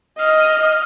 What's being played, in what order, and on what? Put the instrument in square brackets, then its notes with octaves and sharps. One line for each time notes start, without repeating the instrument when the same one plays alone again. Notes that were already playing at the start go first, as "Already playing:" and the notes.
[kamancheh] D#5 [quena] F6